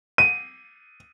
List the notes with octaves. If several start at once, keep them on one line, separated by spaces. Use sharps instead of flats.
D#7